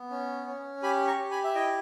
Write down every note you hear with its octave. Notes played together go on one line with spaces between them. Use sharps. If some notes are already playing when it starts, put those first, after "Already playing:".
Already playing: B3
C#4
C#4
G4 G#5 B5
A#5 C#6
G4
G#5 B5
E5
E4 D#5 G5